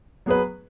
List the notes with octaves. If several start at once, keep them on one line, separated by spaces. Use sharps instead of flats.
F#3 B3 G#4 B4